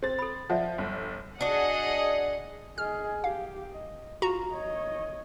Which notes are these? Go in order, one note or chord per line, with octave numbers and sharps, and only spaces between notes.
C4 A6
A4 B5
F3 D5 E5 F#5
G1
D4 F#4 G#4 D#5 F#5
G#4 D#5 F6
G4 F5
D#5
F4 F#4 A#5
C#5 D#5